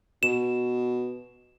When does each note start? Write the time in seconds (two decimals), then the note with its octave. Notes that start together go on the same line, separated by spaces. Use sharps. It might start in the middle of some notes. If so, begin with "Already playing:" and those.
0.23 B2 E7